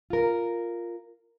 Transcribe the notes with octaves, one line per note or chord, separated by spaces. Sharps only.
F4 A#4